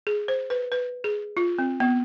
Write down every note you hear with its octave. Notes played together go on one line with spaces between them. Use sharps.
G#4
C5
B4
B4
G#4
F4
C4
B3